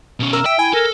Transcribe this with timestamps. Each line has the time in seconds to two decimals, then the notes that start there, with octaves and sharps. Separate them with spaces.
0.20 B2 C#4
0.33 A#4 E6
0.46 E5 G5
0.59 E4 G#5
0.74 A4 A#4